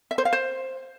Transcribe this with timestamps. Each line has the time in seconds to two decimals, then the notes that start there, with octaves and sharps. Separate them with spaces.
0.11 E5
0.18 C5
0.25 F5
0.33 C5